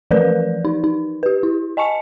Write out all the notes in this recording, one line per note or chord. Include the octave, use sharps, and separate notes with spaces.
E3 F3 A3 A#4 B4 D5
D#4
D#4
G4 B4
E4
D#5 G#5 A5 C#6 C#7